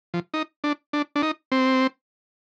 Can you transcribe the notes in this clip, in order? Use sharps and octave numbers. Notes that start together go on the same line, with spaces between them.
F3
D#4
D4
D4
D4
D#4
C4